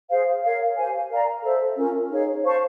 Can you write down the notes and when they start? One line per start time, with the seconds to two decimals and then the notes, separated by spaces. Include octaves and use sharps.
0.09 G#4 C5 F5
0.43 A#4 C#5 F5
0.76 G4 C5 F5 G#5
1.10 A#4 D5 F5 A#5
1.43 A4 C5 E5
1.76 C#4 F4 A#4
2.10 D#4 G#4 C#5 F5
2.43 C5 F5 A5 C#6